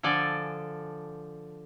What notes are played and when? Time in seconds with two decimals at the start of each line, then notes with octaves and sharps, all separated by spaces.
0.03 D3 F3 A4 D5 G#5